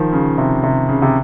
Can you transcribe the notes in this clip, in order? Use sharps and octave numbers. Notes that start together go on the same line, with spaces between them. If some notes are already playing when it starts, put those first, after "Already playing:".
Already playing: D#3 F3
C#3
C3
C3
C#3
C3